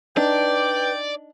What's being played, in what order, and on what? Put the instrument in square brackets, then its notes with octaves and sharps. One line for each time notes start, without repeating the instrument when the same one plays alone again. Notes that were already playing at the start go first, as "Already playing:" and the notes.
[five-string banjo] D4 D#4 [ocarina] B4 [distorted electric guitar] D5 [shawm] G5